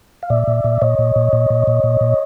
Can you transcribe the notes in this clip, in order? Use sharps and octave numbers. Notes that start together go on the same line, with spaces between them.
F5
A#2 D5 E5
A#2
A#2
A#2 C#5 D#5
A#2
A#2
A#2
A#2
A#2
A#2
A#2